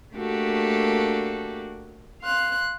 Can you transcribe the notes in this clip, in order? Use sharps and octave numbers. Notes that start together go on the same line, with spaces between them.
A3 A#3 D4 F#4 G4 A4
F5 C6 F#6